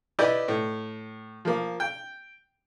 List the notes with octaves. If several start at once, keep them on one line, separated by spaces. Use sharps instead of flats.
E4 G4 B4 D5 D#5
A2
F3 A#3
G5